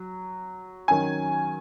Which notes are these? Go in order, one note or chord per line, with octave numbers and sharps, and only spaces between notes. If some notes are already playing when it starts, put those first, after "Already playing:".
Already playing: F#3
D#3 F#3 C#4 G#5